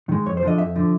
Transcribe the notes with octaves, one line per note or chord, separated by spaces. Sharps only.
D#3 G#3
F2 C#5
C5
D3 F3 D#5
F2 E5
D3 F3